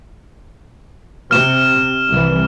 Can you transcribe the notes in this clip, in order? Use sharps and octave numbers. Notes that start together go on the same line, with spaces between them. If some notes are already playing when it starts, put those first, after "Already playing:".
C3 F6 E7
C2 E3